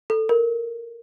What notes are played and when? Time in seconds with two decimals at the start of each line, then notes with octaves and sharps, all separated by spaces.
0.10 A4
0.29 A#4